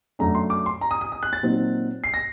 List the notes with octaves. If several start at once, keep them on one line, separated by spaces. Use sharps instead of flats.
F#2 F#3 A3 D4 A#5
C6
D6
C6
A#5
D#6
D#6
D#6
F#6
A6
A#2 F#3 C4 D#4
C7
A#6